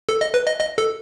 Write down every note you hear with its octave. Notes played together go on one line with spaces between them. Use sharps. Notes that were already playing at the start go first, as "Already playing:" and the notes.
A4
D#5
B4
D#5
D#5
A4